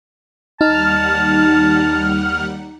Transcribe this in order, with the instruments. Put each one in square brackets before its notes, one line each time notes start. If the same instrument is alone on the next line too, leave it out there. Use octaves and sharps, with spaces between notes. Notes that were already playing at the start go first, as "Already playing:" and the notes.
[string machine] D#2 G3 F#5 [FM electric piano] D#4 [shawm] A5 [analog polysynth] F6